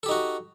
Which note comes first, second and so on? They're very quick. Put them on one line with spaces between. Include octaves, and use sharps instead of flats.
A4 G4 D#4 F#4